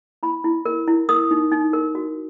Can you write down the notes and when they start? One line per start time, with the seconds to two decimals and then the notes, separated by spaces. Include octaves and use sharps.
0.23 E4 B5
0.44 E4
0.66 A#4
0.87 E4
1.09 A#4 D#6
1.31 D#4
1.52 D#4
1.73 A#4
1.95 F#4